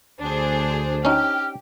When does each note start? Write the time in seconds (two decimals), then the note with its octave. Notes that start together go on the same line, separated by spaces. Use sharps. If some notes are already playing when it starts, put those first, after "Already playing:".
0.21 D2 D4 G#4 C5
1.05 C#4 D#4 G4 F6